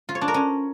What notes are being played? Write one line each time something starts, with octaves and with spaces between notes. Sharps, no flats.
F4
C#5
D4
A#4
C#4